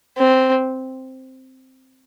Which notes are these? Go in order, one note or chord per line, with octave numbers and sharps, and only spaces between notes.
C4